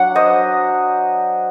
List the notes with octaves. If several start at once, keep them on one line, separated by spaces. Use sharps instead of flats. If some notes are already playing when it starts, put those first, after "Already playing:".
Already playing: F#3 D4 F#5
C5 D#5